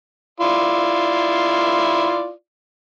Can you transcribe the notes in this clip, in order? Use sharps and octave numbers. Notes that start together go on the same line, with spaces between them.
E4 F4 D5